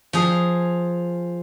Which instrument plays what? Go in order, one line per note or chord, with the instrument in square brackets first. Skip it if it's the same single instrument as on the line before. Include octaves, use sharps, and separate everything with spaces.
[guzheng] F3 G#4